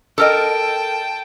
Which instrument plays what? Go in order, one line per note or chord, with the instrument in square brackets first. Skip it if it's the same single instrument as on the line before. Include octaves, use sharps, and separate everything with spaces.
[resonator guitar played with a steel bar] A4 A#4 D#5 [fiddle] G5 A5